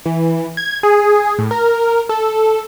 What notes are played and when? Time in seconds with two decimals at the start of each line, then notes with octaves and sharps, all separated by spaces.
0.06 E3
0.57 G#6
0.83 G#4
1.39 A2
1.51 A#4
2.09 A4